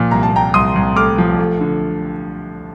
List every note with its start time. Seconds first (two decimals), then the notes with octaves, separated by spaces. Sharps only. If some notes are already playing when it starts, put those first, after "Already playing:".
Already playing: A#2 F3
0.11 C2 A#5
0.23 A5
0.32 A#2 G5 A#5
0.54 C2 C6 D#6
0.75 C2
0.96 A3 D6 F6
1.18 F3
1.39 A3
1.61 D3